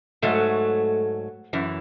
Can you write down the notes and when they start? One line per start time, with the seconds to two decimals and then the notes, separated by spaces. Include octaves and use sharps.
0.22 G#2 F#3 A3
1.53 F#2 E3